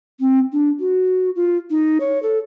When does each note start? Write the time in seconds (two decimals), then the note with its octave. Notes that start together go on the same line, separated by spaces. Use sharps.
0.20 C4
0.53 D4
0.80 F#4
1.36 F4
1.70 D#4
2.00 C#5
2.23 A4